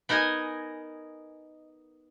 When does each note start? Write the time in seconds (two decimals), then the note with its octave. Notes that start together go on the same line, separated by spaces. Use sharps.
0.09 B3 D#4 A#4 D#5 G#5